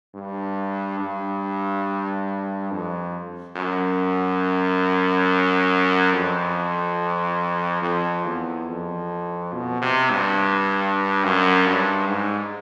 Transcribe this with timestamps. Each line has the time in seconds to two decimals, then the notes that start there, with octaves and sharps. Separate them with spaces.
0.15 G2
1.00 G2
2.71 F2
3.56 F#2
6.13 F2
7.82 F2
8.25 E2
8.68 F2
9.53 B2
9.82 C3
10.11 G2
11.24 F#2
11.66 G2
12.09 G#2